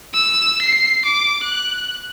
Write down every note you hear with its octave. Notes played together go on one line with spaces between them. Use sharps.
E6
C7
D6
F#6